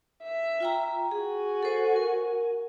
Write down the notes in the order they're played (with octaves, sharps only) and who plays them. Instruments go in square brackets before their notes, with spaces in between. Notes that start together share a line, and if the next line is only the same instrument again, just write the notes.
[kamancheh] E5
[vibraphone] F4 G5 A#5
[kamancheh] F#4 G#5 [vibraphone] G#4
[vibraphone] A4 C5
A#4